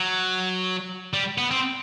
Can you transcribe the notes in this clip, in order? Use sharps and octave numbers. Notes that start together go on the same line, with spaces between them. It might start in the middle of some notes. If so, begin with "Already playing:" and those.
Already playing: F#3
G3
B3
C4